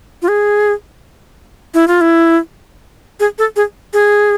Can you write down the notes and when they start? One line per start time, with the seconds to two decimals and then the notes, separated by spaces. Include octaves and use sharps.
0.22 F4
0.28 G#4
1.74 E4
1.88 F4
2.01 E4
3.20 G#4
3.38 A4
3.56 G#4
3.93 G#4